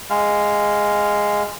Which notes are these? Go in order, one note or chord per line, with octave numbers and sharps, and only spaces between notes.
G#3 F5